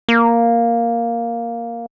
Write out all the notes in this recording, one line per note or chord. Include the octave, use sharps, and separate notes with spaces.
A#3